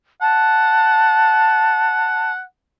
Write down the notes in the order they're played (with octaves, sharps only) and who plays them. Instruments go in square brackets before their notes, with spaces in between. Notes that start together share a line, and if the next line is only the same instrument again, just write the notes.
[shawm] F#5 [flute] A5